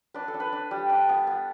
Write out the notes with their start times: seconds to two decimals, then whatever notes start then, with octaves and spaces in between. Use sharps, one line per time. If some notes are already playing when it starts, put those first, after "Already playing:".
0.14 D4 B4
0.28 A4
0.34 D4
0.40 B4
0.52 D4
0.71 G3
0.90 D4
1.09 B3
1.27 B3